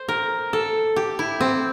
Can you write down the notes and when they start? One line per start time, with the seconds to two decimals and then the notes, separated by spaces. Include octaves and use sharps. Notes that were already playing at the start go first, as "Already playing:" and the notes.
Already playing: C5
0.08 A#4
0.53 A4
0.96 G4
1.19 E4
1.40 C4